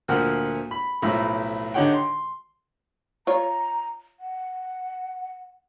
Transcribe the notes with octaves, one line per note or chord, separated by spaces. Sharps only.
D2 A#2 F3 A#3 F#5 F6
B5
B1 A2 F3 B5 E6
D3 D#4 G4 C#5 F#5 G5
C6
F4 C#5 A#5
F#5